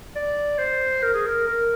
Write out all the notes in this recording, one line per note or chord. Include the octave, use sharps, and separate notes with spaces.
D5
C5
A#4
G#4
A#4
A#4